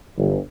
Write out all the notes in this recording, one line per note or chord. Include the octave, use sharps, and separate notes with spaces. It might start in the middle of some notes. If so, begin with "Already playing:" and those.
G1